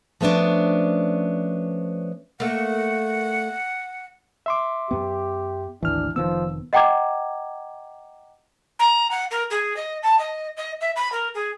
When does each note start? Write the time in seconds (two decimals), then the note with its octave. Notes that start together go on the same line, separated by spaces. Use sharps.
0.21 F3 A3 B3 C#4 D4
2.40 A3 A#3 F#5
4.46 E5 C6 D6
4.91 F#2 B3 G4
5.83 G#1 D2 E3 D4 F6
6.16 F1 D#3 F3 B3 E6
6.73 D#5 F#5 G5 A#5 D6 G#6
8.79 A#5
9.11 F#5
9.31 A#4
9.50 G#4
9.76 D#5
10.02 A5
10.19 D#5
10.57 D#5
10.80 E5
10.96 B5
11.12 A#4
11.34 G#4